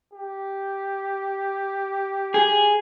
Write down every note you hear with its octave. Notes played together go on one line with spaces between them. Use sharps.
G4
G#4